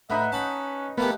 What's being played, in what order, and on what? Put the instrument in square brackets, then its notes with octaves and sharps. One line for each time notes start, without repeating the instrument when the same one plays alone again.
[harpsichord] A2 [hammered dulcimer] D#4 B4 F#5 [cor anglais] E5
[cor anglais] C#4 [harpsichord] A5 B5
[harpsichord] A#2 A3 G4 [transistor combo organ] B3 [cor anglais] A#4